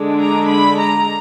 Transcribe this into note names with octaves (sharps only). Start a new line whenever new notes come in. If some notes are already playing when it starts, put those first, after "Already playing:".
Already playing: D3 G#3 D4
A#5
B5
A#5